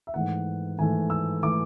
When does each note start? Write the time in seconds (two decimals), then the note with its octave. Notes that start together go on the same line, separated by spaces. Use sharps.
0.07 E5
0.14 G#2 E3 A3 F#5
0.78 G#2 E3 A3 G#5
1.10 E6
1.43 E3 A3 D6